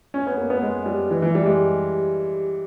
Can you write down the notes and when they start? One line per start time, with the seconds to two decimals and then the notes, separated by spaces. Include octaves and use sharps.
0.14 C#4
0.27 B3
0.38 A#3
0.50 B3
0.62 G#3
0.86 G3
1.11 E3
1.22 E3
1.35 G3
1.46 G#3